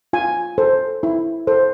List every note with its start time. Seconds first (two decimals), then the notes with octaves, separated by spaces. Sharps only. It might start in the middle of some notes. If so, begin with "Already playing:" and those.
0.13 F4 G#5
0.58 A4 C5
1.03 E4
1.47 A4 C5